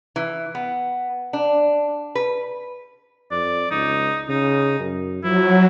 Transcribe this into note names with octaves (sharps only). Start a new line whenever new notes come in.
E3
B3
D4
B4
F2 D5
C#2 D#4
C#3 D#4
F#2
F3 F#3 E4